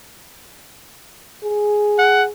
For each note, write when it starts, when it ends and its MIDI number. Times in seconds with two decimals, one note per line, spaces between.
1.44 2.31 68
1.98 2.24 78